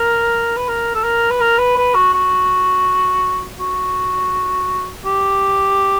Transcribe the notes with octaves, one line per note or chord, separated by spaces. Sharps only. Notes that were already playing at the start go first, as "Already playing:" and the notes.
Already playing: A#4
B4
A#4
A4
A#4
B4
A#4
B4
B4
F#4
F#4
F#4
G4